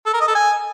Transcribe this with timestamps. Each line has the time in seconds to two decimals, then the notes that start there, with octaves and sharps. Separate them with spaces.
0.06 A4
0.13 A#4
0.21 D#5
0.28 A4
0.35 G#5